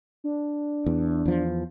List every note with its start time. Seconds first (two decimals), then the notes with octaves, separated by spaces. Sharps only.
0.24 D4
0.86 E2
1.26 E2 F3